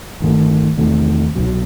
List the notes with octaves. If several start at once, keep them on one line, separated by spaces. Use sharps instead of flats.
G1 F#2 D#3 A3
E2 C3 D#3 A3
C2 B2 F#3